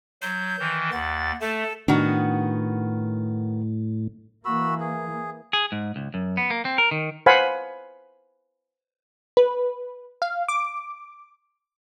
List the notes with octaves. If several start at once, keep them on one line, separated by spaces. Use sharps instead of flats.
F#3 G6
D#3 E3
D#2 F#5 A6
A3 A4
A2 D#3 B3 D4 F#4
E3 A#3 F#4 B5 E6
G#4
G#4
G#2
C#2
F#2
B3
A#3
C4
A#4
D#3
B4 C5 F5 F#5 G#5 B5
B4
F5
D6